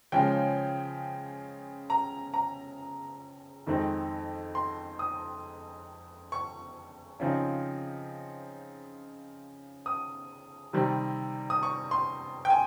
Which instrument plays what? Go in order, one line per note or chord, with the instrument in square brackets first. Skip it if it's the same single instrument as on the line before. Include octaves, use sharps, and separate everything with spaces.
[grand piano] C#3 F3 G#3 C#4 G5
A#5
A#5
F2 D#3 G#3 C4 D#4
C6
D#6
C#6
C#3 F3 C4 D#4
D#6
C3 D#3 G3 C4
D#6
C#6
C6
G5
G#5